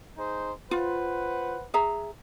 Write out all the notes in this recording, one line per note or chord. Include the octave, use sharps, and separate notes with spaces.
D#4 G#4 C5
F4 B4 C5 F#5
G#4 E5 A#5